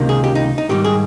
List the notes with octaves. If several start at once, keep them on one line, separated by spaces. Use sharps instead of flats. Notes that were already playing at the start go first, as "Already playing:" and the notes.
Already playing: C#2 C3 D#3 A#3
G#4
G4
D#4
D#4
G#2 D#3 G3 G4
G#4